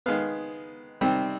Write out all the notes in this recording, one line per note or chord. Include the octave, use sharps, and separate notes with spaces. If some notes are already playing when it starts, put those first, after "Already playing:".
D#3 G#3 B3 F5
C3 D#3 G3 C4